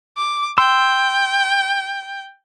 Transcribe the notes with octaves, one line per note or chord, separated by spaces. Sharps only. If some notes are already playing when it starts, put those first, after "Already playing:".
D6
G5 C6 E6